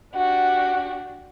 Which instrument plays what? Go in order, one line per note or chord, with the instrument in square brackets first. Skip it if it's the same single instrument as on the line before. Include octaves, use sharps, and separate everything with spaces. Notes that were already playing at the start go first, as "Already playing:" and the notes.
[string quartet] D4 F#4 G4 [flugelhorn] F#5